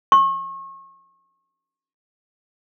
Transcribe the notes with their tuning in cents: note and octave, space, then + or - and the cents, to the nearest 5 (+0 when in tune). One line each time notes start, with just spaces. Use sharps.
C#6 -35